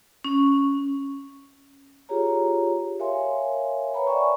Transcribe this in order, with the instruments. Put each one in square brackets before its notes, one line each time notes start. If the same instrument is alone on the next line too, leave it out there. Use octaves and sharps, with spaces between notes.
[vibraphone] C#4
F4 G4 G#4 C#5 A#5
A#4 C#5 E5 F5 G#5 C6
B4 C#5 F#5 A#5 B5
D5 E5 G5 G#5 C#6